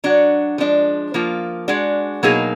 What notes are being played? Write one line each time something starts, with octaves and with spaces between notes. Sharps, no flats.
F#3 D4 F#4
F3 G#3 D4
F3 A#3 F4
G#3 D4 F#4
B2 F#3 A#3 D#4 G#4